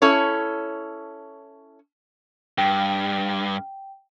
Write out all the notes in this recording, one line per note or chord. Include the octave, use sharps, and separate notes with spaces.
C#4 E4 A4 C#5
G2 G5